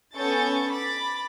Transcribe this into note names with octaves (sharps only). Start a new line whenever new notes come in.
B3 C#4 A4 C#6 G6 A6
B5 D6 A6